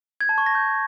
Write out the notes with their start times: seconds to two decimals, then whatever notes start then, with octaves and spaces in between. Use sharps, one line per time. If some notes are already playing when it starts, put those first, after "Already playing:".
0.21 G#6
0.29 A5
0.38 C#6
0.46 A#6
0.55 G6